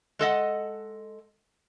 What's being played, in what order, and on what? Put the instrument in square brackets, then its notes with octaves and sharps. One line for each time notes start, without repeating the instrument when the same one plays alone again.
[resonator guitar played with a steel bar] G#3 A4 D#5 F#5